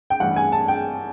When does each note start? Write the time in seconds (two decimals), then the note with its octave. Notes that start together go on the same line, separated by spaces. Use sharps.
0.10 G5
0.20 A1 G2 E3 F#5
0.36 G#5
0.52 A5
0.68 G5